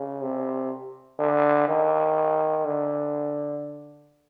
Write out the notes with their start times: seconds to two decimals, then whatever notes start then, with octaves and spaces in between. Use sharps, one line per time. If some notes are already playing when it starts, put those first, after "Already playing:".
Already playing: C#3
0.22 C3
1.19 D3
1.68 D#3
2.65 D3